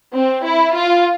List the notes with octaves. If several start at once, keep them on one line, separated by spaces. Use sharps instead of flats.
C4
E4
F4